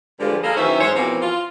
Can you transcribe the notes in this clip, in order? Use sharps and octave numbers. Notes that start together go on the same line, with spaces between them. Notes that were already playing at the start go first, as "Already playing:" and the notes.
G2 D3 F3 G3 G#3 F4
A#3 G#4 A4 B4 D#5 F5
F#2 D#3 E3 C#4 C5 E5
G#2 C5 C#5
B2 E3 F3 A#3 C4
F4